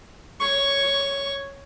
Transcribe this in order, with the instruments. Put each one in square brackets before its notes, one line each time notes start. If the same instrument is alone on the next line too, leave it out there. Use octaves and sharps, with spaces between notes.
[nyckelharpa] C#5 C#6